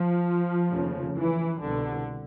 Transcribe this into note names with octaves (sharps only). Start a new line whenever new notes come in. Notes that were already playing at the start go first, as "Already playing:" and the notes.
Already playing: F3
F1 D#2 C#3
E3
C2 B2 D3